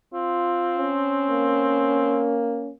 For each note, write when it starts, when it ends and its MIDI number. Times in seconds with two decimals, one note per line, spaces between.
0.14 2.27 60
0.14 0.91 65
0.77 2.70 61
1.29 2.73 58